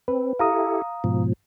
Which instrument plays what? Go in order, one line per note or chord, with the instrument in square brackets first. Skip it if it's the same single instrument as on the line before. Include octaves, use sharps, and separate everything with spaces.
[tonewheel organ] C4 [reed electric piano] B4
[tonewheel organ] E4 G4 A4 [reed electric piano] F5 A#5 D#6
[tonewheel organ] G#2 B2 F3